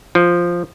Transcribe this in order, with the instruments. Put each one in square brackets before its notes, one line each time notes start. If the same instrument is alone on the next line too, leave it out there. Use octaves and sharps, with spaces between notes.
[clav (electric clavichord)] F3